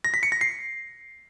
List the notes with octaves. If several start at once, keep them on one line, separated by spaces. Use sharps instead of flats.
A#6
B6
C#7
A#6
C7